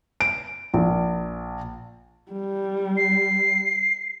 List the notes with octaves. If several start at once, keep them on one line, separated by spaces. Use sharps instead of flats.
D7
A#1
G3
C7